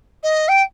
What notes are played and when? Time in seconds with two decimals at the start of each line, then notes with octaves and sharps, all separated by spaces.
0.23 D#5
0.48 G5